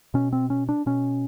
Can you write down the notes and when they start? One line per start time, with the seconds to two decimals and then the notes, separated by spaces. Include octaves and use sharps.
0.14 B2 C#4
0.33 C4
0.50 C#4
0.69 D4
0.86 B2 C#4